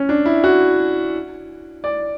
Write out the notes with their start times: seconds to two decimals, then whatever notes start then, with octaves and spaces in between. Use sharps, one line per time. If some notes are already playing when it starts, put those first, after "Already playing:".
Already playing: C#4
0.09 D4
0.25 E4
0.44 F#4
1.84 D5